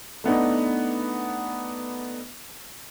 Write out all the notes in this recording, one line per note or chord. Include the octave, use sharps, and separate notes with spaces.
A3 B3 D4 D#4